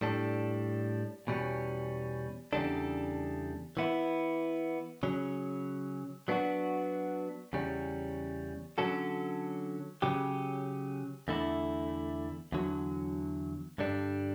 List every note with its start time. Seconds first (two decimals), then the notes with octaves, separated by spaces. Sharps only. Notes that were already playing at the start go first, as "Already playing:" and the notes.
0.01 A2 G3 D4 A4
1.27 E2 B2 G3 C#4
2.53 E2 C#3 G3 D4 A4
3.77 E3 B3 E4
5.03 C#3 F#3 C#4
6.28 F#3 B3 D4 F#4
7.53 E2 C#3 G3 C#4
8.78 D3 F#3 C#4 F#4 A4
10.02 C#3 F#3 C#4 G4
11.28 E2 D3 A3 E4
12.52 E2 D3 F#3
13.78 G2 D3 G3 D4